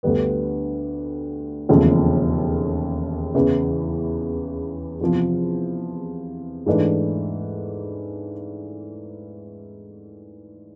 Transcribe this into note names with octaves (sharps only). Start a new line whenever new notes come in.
D2 D3 G3 B3
E1 D#2 C#3 F3 A3
E2 C#3 E3
E2 C3 F3
G#2 E3 A3 D4